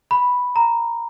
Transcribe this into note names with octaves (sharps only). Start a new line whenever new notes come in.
B5
A#5